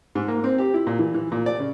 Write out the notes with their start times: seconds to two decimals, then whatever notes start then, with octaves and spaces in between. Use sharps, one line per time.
0.15 G#2
0.28 A#3
0.44 C4
0.58 G4
0.74 E4
0.87 A#2
0.99 E3
1.14 E3
1.32 A#2
1.46 D5
1.60 C#3